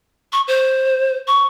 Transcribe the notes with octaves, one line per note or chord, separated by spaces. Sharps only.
C#6
C5
C#6